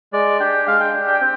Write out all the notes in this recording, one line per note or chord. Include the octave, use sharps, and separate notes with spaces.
G#3 D5
D4 G4 G5
G#3 F5
G5
D4 G4
G5
C4